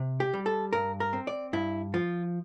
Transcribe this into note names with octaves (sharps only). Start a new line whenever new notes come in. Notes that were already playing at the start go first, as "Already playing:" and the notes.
Already playing: C3
G4
G3
A4
G2 A#4
A#4
C4
D5
G2 E4
F3 F4